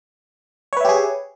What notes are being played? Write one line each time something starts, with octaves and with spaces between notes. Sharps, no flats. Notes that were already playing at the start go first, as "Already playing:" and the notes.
G4 G#4 B4 C#5 E5